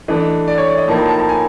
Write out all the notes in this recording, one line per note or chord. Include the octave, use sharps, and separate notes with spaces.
E3 A3 D4 D#5
D5
C#5
D5
D#5
A2 F3 A#3 D#4 A5
A#5
A5
A#5
G#5